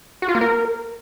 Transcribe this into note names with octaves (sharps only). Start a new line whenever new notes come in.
F#4
F4
A#3
A#4